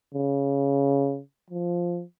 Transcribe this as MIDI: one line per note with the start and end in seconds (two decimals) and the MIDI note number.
0.14 1.21 49
1.51 2.03 53